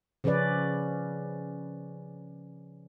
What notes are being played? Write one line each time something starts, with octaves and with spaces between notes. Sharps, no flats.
C#3 F3 C#4 B4 D5